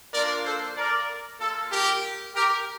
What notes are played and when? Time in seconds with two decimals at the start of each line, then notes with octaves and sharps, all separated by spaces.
0.13 A#3 D4 F4 A#4 D5
0.45 A4 C5
0.76 A#4 D5
1.40 A#3 F4 A4
1.72 G4 A#4
2.35 G4 A#4